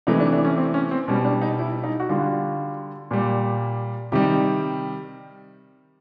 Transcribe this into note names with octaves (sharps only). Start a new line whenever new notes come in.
C3 E3 A3 D#4
D4
D4
C#4
C4
C#4
C4
B2 G3 C#4
D4
D#4
E4
D#4
F#4
D3 G3 F4
A#2 G3
C3 D#3 G3 G4